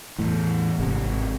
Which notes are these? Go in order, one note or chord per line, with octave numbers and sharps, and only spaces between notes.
E2 A2
G#1 C3